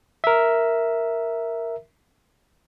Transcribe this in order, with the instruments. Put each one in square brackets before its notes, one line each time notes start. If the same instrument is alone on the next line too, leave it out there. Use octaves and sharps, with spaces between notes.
[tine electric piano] A#4 E5